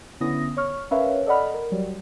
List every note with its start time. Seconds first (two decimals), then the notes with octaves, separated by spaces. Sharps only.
0.20 D3 B3 C#4 E4 D#6 A#6
0.57 C#5 C#6 F6
0.91 C#4 A#4 B4 C#5 E5 F5
1.26 A4 D5 D#5 F#5 B5 F6
1.54 A#4
1.72 F#3 G3